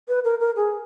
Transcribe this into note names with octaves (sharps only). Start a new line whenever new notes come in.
B4
A#4
A#4
G#4